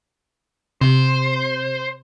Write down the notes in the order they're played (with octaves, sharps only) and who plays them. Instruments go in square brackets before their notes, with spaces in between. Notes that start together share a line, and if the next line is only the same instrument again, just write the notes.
[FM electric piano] C3 [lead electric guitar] C5